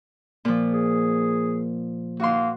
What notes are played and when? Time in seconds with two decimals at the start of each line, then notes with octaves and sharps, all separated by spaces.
0.45 A#2 F3
0.73 G#4
2.20 A#3 F#4 C6